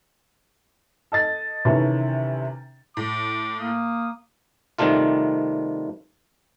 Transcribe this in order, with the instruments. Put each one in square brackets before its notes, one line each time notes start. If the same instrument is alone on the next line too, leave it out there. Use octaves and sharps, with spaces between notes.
[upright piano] A4 D#5 A6
C3 D#3 E3 C#4 E4 A4
[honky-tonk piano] A2 [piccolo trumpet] D6
[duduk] A#3 [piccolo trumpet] D#6
[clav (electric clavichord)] C3 D#3 G3 A3 F4